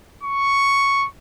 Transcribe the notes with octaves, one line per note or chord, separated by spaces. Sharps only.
C#6